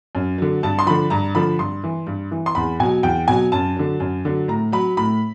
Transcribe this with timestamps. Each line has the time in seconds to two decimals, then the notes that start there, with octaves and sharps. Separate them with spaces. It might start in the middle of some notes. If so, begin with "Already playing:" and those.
0.15 F#2
0.38 D3 F#3
0.63 G2 A5
0.79 C6
0.86 D3 F3 B5
1.10 G2 A#5
1.35 D3 F3 B5
1.59 G2 C6
1.84 E3
2.07 G2
2.31 E3
2.46 C6
2.55 E2 B5
2.80 B2 F#3 G#5
3.03 E2 G5
3.28 B2 F#3 G#5
3.52 F#2 A5
3.76 D3 F#3
4.00 F#2
4.25 D3 F#3
4.48 A2 A#5
4.72 F#3 B5
4.97 A2 B5